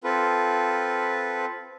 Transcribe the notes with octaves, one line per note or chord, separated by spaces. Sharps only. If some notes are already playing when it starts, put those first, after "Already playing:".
C4 F4 A4 B4